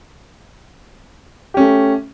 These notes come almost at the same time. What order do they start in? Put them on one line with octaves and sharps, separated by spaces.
G4 C#4 A3